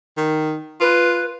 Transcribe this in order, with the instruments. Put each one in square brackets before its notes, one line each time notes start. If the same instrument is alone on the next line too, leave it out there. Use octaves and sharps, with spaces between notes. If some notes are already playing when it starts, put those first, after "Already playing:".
[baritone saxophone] D#3
[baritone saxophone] F4 [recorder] B4